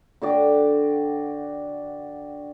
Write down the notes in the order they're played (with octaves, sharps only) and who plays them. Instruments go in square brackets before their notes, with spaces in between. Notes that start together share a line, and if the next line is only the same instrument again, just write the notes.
[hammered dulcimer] D3 F#4 D5 G5